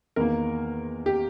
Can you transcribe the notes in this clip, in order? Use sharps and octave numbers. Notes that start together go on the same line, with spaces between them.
E2 D#3 A#3 A#4
G4